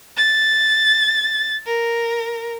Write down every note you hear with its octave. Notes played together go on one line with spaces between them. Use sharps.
A6
A#4